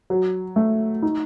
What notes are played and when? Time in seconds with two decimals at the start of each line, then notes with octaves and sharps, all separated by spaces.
0.10 F#3
0.56 A3
1.02 D#4